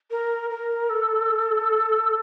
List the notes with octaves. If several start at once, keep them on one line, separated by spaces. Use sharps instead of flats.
A#4
A#4
A4